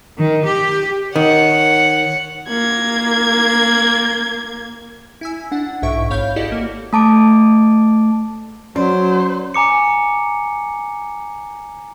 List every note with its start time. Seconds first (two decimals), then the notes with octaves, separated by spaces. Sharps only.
0.17 D#3
0.46 G4
1.16 D#3 C#5 F#5
2.49 A#3 G#6
5.21 E4 G#5 E6
5.52 D4 F#5
5.82 B1 G#2 E4 E5 C#6 D7
6.10 G#1 C#5 F5 B5 G6
6.36 E4 F#4 G4 A4 D5 D#5
6.52 A#3 F#4
6.93 A3 A5 D6 D7
8.76 F#3 C#4 C5 D5
9.54 G#5 A#5 D6 C#7